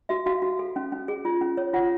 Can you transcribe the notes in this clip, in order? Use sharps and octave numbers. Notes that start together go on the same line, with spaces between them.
F#4 E5
F#4 F5
F#4
A4
C#4
C#4
G#4
F4
C#4
C#5
F4 F#5